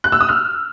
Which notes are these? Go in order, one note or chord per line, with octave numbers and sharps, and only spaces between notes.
F#6
E6
D#6
F6